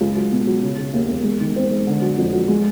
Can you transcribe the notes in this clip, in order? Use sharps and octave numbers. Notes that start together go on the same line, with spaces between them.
C#2
F#3
B2
F#3
C#3
C#3
D#2
E1
G#3
D#3
C4
G#3
D3
F#3
F2
F#3
G#3